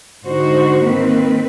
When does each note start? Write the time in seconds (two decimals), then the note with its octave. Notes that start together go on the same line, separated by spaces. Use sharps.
0.25 G#2 D3 D#4 F#4 C5
0.82 D#3 A#3 C4 B4